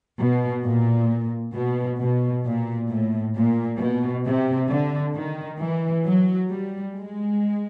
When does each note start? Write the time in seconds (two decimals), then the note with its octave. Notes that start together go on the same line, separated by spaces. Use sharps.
0.19 B2
0.64 A#2
1.54 B2
2.00 B2
2.45 A#2
2.89 A2
3.35 A#2
3.79 B2
4.25 C3
4.69 D3
5.14 D#3
5.60 E3
6.05 F#3
6.50 G3
6.95 G#3